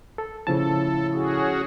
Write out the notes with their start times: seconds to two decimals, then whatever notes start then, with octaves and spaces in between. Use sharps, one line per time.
0.18 A4
0.47 A2 C#3 F3 A4 A5
1.13 C#4 F#4 G#4